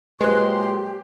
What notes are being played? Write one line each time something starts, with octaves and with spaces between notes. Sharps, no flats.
A#2 F#3 G#3 G4 B4 C5 C6 F#6